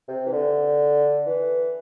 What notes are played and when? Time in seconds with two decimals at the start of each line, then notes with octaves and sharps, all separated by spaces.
0.08 C3
0.26 E3
0.32 D3
1.26 E3